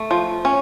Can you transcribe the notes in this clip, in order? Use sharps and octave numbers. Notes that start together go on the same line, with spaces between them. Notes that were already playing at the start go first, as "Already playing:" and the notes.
Already playing: A3
F3
C#4